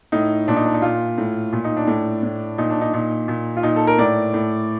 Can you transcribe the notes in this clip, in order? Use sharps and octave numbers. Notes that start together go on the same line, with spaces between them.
A2 D#4
A#2 D4
D#4
D4
D#4
A#2 F4
A2
A#2
D#4
D4
A2
A2
A#2 D#4
D4
D#4
A#2 D#4
A#2
F4
A#2 D#4
A4
A#4
A2 D5
A2